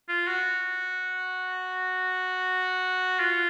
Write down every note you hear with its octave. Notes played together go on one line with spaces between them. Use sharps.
F4
F#4
F4